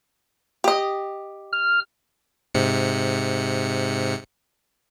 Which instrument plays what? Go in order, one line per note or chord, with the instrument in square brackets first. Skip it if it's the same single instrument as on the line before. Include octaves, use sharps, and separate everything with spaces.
[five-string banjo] G4 D#5
[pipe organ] F6
[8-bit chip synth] G#2 C3 C#7